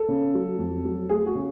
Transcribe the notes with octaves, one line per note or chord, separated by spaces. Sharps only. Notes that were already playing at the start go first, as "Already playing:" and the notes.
Already playing: A4
C#3
F#3
F2
F#3
A3 G#4
F#4
C#3